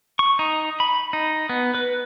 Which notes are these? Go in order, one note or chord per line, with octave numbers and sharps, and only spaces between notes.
C#6
D#4
B5
D#4
B3
B4